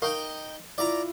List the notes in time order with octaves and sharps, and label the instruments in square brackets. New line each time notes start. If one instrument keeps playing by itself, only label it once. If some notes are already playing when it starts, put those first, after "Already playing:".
[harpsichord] D#4 G5 [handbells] A#4 F5 C#6
[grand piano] E4 F4 [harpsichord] D5 A#5